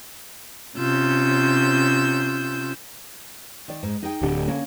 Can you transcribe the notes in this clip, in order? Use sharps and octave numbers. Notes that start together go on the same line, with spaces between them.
C3 C#4 F4 E6 G6
D#3 D5
G#2
D#4 G#4 G5
D1 D3 G4
A#3 C#4